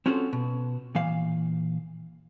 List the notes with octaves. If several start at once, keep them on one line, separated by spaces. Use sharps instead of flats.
C4 C#4 F4 F#4 G#4 A4
B2
A#2 E3 F5